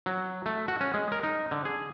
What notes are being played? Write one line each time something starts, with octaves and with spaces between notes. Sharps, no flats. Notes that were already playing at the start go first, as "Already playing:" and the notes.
F#3
A3
F#4
C#4
G#3
A#4
D#4
D3
G#4